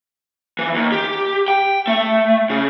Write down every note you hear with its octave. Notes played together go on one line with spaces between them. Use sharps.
E3
D#2
G4
G5
A3
C#3